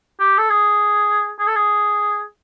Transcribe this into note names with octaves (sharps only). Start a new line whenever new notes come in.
G4
A4
G#4
G#4
A4
G#4